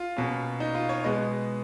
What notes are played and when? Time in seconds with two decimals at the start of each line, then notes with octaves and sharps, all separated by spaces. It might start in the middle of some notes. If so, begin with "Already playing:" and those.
Already playing: F4
0.17 B2 A#3 C#4
0.60 D#4
0.75 F4
0.89 C#5
1.04 B2 G#3 B3 D#5